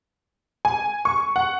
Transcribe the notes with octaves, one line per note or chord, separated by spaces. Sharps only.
G#5
C#6
F#5